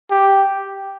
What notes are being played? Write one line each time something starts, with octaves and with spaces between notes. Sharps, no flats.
G4